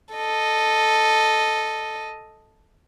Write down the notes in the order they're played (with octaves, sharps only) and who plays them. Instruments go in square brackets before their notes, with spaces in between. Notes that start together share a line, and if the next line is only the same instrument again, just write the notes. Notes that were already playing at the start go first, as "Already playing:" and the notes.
[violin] A4 D#5